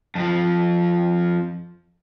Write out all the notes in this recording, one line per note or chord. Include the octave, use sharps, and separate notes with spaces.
F2 F3